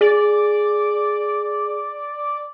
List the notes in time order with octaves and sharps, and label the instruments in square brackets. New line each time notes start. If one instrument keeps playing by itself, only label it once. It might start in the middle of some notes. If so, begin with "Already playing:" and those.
[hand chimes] G#4 [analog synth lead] D5